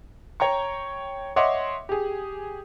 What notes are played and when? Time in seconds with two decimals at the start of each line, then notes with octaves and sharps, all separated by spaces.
0.40 C#5 G5 A#5 C#6
1.36 C#5 D#5 E5 F#5 C6 D6
1.89 G4 G#4